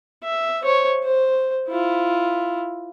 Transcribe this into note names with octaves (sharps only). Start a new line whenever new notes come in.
E5
C5 C#5
C5
E4 F4